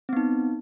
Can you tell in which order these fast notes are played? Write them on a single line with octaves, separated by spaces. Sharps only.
C4 B3 D#4